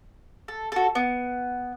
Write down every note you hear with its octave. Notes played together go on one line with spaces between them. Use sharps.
A4
F#4 A4
B3